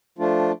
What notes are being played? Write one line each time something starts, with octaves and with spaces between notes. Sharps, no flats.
F3 A3 D4 F4